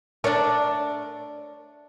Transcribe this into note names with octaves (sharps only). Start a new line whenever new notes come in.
A3 D4 A#4 C#5 D5